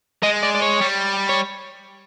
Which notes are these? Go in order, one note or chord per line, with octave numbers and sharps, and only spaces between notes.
G#3 D#5
D5
D5
C#5
G3
C#5